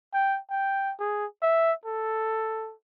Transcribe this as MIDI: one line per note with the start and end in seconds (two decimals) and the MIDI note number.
0.14 0.39 79
0.50 0.93 79
1.00 1.26 68
1.42 1.72 76
1.86 2.73 69